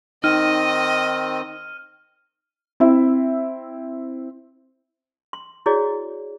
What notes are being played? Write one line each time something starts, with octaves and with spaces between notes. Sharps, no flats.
D#3 C4 D#4 D#5 F6 D#7
C4 E4 E5
C6
E4 F#4 G#4 C#5 D5